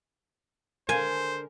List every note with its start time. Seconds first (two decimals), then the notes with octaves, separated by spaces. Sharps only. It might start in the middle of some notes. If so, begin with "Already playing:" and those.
0.89 D3 G#4 A#4 C5 G#5